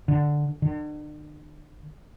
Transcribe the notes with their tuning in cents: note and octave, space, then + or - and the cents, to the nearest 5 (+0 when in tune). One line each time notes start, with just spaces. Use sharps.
D3 +5
D3 +40